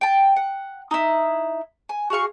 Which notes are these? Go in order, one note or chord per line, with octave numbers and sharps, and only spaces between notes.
G5 A5
F#5
D#4 E4
G#5
F#4 G#4 F5 C#6